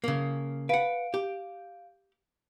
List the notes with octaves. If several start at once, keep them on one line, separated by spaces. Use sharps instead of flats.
C#3 A#3
B4 F5 F#5 D7
G4